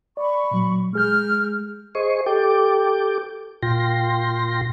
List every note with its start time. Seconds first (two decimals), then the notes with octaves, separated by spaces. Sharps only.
0.17 D5 B5 C#6
0.51 A#2 F#3
0.93 G#3 G#4 F6 G6
1.95 G#4 C5 D#5 C#6
2.26 G4 A4 G5 D6
3.62 A#2 F4 G5 C6 A#6